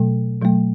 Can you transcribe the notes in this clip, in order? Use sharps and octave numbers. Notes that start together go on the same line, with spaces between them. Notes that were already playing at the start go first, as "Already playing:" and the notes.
Already playing: B2 F#3 A3
B2 F#3 A3